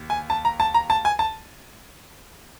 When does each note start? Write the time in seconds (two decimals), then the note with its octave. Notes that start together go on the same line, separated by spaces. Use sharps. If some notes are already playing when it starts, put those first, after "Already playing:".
Already playing: D#2
0.10 G#5
0.30 A5
0.45 A#5
0.60 A5
0.74 A#5
0.90 A5
1.05 G#5
1.19 A5